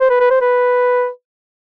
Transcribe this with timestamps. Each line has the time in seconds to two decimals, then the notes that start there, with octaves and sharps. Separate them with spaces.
0.01 C5
0.10 B4
0.20 B4
0.31 C5
0.41 B4